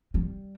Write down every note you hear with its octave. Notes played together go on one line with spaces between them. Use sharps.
G3